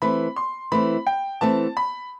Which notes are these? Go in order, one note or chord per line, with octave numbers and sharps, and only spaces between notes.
E3 A3 C4 B5
C6
E3 A3 C4 B5
G5
E3 A3 C4 A5
B5